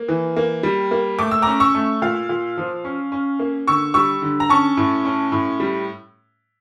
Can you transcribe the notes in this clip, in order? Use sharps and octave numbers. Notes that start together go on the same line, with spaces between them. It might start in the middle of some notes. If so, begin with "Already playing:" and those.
Already playing: A#3
E3
A#3
G3
A#3
A3 D6
E6
C#4 A#5 D6
C#6 E6
A3
A#2 F5
A#2
F3
C#4
C#4
A#3
D3 C#6 E6
G3 C#6 E6
D3
A#5
C#4 A5 C#6
A2
C#4
A2
G3